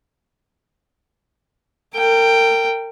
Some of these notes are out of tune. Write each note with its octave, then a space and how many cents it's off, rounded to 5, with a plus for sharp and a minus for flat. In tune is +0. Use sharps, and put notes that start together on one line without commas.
A#4 -35 G5 +0